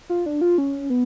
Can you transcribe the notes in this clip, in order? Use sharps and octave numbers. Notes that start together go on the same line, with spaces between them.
F4
D4
F4
C#4
B3